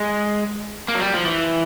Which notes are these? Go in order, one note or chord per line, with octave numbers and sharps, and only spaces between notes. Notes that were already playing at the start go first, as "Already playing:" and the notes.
Already playing: G#3
A#3
F#3
G3
F3
E3